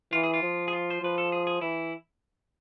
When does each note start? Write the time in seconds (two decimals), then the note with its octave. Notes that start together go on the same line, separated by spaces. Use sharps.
0.13 E3 F4
0.23 G#4
0.34 F4
0.43 F3
0.68 G#4
0.73 F4
0.90 C5
1.02 F3 B4
1.18 A4
1.32 G#4
1.47 G#4
1.61 E3 E4